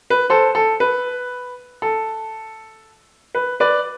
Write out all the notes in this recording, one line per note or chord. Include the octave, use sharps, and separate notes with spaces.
B4
A4 C5
A4
B4
A4
B4
B4 D5